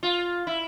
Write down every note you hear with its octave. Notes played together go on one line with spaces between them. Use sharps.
F4
E4